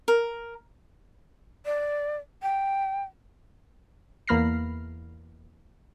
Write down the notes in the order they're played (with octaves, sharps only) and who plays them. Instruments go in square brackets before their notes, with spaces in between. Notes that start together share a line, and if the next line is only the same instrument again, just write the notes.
[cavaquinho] A#4
[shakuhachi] D5
G5
[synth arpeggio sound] E2 A#3 B5 F6 A#6 C7